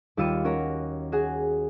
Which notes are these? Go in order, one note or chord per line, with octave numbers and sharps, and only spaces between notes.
D#2 G3 F4 E6 C#7 D#7
C#4 F#4 A#4 C#5
F#4 G#4